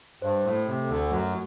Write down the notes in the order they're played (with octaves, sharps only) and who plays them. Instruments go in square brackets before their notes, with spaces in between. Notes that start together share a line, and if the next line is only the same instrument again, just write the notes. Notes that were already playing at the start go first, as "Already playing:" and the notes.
[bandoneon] G2 [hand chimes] C5
[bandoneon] A2
[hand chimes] A3
[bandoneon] C3
[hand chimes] A4
[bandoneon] D2 D3
[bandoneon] F#2 F#3 [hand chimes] A3